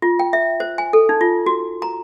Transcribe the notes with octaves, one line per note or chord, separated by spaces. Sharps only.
F4
G5
E5
C5
G#5
A4
D#4
F4
F#4
A#5